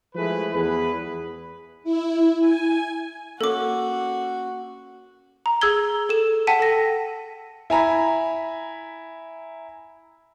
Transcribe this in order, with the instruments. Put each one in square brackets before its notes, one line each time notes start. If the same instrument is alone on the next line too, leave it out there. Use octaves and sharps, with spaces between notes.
[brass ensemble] F3 G#3 A3 E4 G#4 B4
E2 G#4 B4
[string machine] E4
G#5
[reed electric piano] A#3 C#4 [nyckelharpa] F#4 [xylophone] A4 D6
[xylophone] A#5
G#4 E6 G#6 G7
A4 E7
F#5 G5 A5 B6 D#7
A4 A#6
[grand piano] E4 G#5 A#5 B5